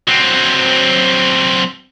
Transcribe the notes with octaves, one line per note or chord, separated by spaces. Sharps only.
F#3 C4